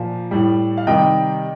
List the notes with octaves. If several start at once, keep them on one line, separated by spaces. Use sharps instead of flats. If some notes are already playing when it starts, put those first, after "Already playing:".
Already playing: A#2 F3
A2 G3
F5
C3 D#3 G3 D#5 G5